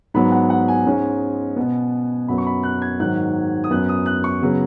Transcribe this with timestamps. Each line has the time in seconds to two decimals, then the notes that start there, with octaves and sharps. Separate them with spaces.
0.14 G#2 F#3 B3 B5
0.32 F#5
0.50 F#5
0.68 G#5
0.86 G#2 G#3 C#4
1.56 B2 B3
2.28 F#2 F#3 B3 B5
2.38 C#6
2.46 B5
2.63 F#6
2.82 G#6
3.00 G#2 D#3 F#3 F#6
3.64 D#6
3.70 F#2 F#3 B3 F#6
3.89 D#6
4.06 F#6
4.24 C#6
4.43 C#3 F#3 B3